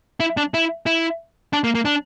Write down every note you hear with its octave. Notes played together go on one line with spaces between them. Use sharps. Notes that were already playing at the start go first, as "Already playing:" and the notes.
E4
D4
E4
E4
D4
A#3
A#3
D4